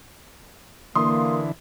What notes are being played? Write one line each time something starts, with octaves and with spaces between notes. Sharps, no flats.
D3 E3 A#3 C6 D#6